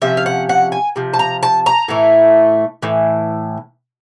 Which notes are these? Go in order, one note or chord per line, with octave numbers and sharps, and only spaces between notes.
C3 F3 C#4 E5
F5
F#5
F#5
G#5
C3 F3
A5
A#5
A5
A#5
A2 E3 A3
A2 E3